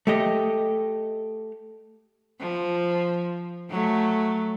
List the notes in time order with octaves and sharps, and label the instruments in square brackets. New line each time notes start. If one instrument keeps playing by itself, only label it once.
[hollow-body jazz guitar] A3 G4 D#5
[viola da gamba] F3
F#3 A3